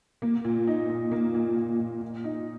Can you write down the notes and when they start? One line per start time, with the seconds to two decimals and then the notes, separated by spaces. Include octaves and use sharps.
0.22 A#3
0.45 A#2
0.67 D#4
0.90 A#2
1.12 A#3
1.34 A#2
1.57 A#2
1.80 A#2
2.01 A#2
2.24 D#4